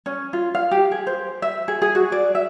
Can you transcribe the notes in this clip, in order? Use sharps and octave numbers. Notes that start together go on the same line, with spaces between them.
C#4
F4
F5
G4
G#4
C5
E5
G#4
G#4
F#4
D5
E5